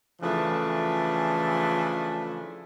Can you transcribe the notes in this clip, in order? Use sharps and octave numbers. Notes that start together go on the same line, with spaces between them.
C#3 E3 F3 A3 D4